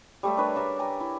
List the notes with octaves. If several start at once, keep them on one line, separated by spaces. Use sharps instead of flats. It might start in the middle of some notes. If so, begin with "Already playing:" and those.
G3 A3 E5
D4 A#4 B4 C#5
A#4 D5 E5
G5 G#5 A#5
E4